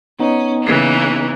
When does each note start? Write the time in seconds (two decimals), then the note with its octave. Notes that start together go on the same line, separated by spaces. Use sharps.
0.19 B3 C#4 D#4
0.64 C#3 E3 A#3